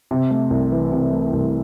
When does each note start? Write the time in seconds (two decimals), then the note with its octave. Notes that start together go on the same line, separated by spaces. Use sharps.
0.11 C3
0.31 A3
0.50 C2
0.72 E3
0.92 C3
1.12 A3
1.33 C2